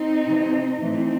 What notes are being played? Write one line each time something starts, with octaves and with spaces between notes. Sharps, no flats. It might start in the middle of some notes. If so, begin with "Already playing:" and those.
Already playing: C4 D#4
C3 E3
A2 E3 C4 D#4